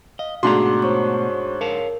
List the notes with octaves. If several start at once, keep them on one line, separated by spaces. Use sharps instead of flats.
D#5 F5
G#2 B2 A3 D4 F#4 A#5 C6 D6
C5 C#5 C#6
A#4 C#5 F5 A5